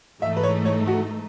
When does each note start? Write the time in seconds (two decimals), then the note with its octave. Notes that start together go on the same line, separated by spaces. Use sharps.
0.22 G#2 E3 A3 D#4 E5
0.37 B4
0.43 C#5
0.65 C#5
0.87 F#4